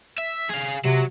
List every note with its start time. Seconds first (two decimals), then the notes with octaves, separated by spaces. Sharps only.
0.18 E5
0.49 G#4 F5
0.85 C3 F#3